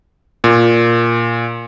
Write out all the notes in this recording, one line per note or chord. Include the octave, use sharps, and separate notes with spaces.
A#2